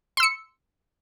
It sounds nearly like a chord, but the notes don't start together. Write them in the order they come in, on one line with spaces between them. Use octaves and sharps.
C6 E6 C#7